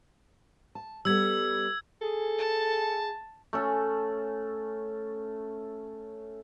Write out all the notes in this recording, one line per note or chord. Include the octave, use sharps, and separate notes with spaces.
A5
G3 B3 A4 E6 G#6
G#4 A4
A5
A3 C#4 A4